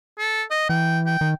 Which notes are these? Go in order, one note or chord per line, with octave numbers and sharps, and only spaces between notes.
A4
D#5
E3 G5
G5
D#3